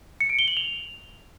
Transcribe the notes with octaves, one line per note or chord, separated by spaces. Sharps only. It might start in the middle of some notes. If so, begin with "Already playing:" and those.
C#7
D7
G7
F#7
F7